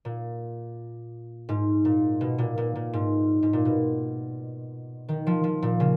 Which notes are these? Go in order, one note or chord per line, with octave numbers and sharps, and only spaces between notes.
A#2
G#2
A#2
B2
A#2
A#2
A#2
G#2
G#2
A#2
B2
D#3
F3
F3
A#2
C#3